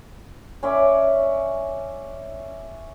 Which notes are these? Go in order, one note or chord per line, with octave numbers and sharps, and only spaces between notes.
C#4 D5 E5